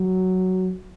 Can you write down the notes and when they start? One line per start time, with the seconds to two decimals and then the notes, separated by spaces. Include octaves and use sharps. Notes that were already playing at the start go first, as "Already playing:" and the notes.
Already playing: F#3